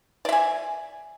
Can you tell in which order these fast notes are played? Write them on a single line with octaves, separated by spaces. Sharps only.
D5 E5 G#5